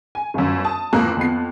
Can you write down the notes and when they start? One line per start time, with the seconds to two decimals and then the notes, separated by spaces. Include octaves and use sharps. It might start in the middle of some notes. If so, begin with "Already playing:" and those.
0.15 G#5
0.34 G1 F#2
0.64 A5 D#6
0.93 A1 F2 A#3 F4 A#5 F#6
1.17 F2 B3 C7